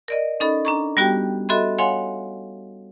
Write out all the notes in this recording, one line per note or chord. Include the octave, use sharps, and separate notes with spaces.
A#4 D5 D#5
C#4 D#4 A4 D#5 B5
D4 A#5 C#6
G3 B3 F#4 G4 G5
F#4 A4 D#5 E5 B5 C6
C#5 F5 F#5 G#5 C6